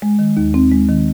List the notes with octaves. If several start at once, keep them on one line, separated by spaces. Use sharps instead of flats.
G#3
D#3
D#2
C4
G#3
D#3